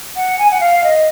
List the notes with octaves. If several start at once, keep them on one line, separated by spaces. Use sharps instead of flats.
F#5
G#5
F#5
F5
D#5